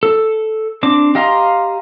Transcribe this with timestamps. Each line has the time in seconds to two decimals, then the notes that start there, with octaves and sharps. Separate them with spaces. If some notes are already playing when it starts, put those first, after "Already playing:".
0.03 A4
0.83 C4 D4 D6
1.15 G4 D#5 F5 A#5 C6